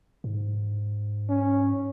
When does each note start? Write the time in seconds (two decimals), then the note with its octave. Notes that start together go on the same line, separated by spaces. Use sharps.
0.24 G#2
1.29 C#4